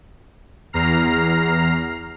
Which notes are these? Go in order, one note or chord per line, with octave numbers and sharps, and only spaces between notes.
E2 A#5 F6 C7